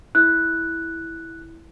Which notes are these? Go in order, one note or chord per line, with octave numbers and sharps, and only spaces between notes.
E4 F#6